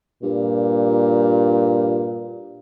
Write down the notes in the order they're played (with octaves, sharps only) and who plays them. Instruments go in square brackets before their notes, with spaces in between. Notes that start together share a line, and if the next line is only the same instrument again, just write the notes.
[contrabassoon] G2 [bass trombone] A#2